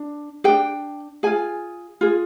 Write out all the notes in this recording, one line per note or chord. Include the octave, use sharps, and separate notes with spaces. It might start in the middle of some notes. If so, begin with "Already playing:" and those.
Already playing: D4
D4 G#4 G5
F4 G#4 G#5
F4 G#4